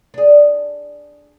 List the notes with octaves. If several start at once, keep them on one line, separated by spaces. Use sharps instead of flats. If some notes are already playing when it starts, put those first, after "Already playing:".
D4 G#4